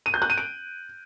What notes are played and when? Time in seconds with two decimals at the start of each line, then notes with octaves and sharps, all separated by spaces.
0.06 D#7
0.14 G6
0.22 F#6
0.30 D#7
0.38 D7